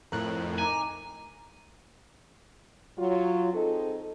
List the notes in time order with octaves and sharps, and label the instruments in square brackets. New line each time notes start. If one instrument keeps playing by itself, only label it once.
[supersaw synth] F2 A2 [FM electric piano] A#4 F#6
[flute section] D#4 A#5 D6 [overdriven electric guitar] G#5
[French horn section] F#3 F4
C4 D#4 G#4 A4